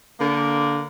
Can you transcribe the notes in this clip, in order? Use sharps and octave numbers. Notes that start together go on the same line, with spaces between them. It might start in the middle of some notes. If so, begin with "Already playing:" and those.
D3 A#3